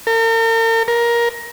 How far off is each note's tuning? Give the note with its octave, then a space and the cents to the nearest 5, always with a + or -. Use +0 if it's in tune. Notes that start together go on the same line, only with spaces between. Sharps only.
A#4 -45
A#4 +15